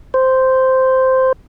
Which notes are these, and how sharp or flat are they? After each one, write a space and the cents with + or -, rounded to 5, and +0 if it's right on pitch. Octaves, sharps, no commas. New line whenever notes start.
C5 -5